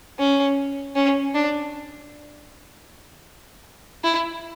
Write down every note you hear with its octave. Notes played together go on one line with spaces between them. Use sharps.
C#4
C#4
D4
E4